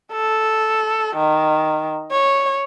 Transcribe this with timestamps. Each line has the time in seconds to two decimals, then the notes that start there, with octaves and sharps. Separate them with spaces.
0.12 A4
1.17 D#3
2.11 C#5